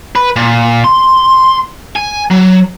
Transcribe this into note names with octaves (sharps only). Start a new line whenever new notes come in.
B4
A#2
C6
G#5
F#3